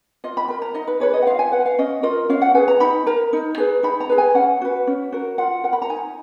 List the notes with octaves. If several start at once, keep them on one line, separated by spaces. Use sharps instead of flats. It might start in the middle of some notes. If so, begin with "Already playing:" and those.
F4 D#5
B5
A#4 B5
A#5
D#4 D#5
B4
G#4 B4 C#5
D#5
F#5
F4 F5
G#5
B4 F#5
F5
C#4 D#5
F4 A#4 D#5
C#4 F5
F#5
G#4 B4 G#5
A#5
D#4 B5
A#4 A#5
D#4
G#4 B4
D#4 B5
A#5
G#4 B4
G#5
C#4 F#5
F#4 B4
C#4
F#4 A#4
F4 F#5
A#4 F#5
B5
A#5
D#4 G#5